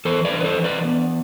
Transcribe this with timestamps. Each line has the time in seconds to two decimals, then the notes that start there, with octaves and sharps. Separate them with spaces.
0.05 E3 A4 C5
0.25 B4 D5
0.32 D4
0.40 B4
0.44 A4 C5
0.57 E3
0.64 B4 D5
0.84 B3